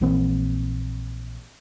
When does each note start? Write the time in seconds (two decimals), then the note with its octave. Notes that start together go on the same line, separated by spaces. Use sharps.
0.01 A#1 E3 A#3 C4